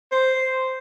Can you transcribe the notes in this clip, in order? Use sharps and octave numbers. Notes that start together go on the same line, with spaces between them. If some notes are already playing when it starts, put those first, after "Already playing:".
C5